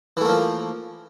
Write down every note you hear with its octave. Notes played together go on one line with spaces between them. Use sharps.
E3 F3 A3 A#3